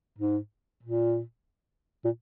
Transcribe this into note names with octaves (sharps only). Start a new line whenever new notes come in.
G#2
A#2
A#2